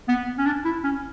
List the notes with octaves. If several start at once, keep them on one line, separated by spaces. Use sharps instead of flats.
B3
C#4
D4
E4
C#4